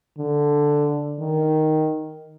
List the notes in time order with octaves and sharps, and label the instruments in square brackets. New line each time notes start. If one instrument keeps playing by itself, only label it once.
[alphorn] D3
D#3